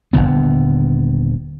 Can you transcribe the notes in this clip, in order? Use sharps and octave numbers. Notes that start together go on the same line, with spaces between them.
D#1 F2 D3 B3